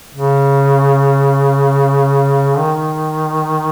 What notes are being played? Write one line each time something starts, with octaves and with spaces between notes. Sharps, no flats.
C#3
D#3